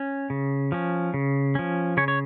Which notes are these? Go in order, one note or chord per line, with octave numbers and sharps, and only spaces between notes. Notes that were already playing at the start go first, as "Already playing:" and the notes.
Already playing: C#4
C#3
F3 C#4
C#3
F3 C#4
C#3 C#4 C#5
C#5